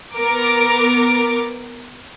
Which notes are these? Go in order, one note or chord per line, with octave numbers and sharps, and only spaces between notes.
B3 A#4 D6